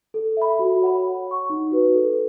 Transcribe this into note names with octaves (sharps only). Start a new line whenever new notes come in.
A4
E5 B5
F#4
C#5 F#5 B5
C#5
F#5 C#6
D#4
F#4 B4
A4